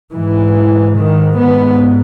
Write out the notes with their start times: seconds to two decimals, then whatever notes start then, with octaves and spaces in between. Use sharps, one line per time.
0.13 G#2 E3
0.97 D#3
1.37 B3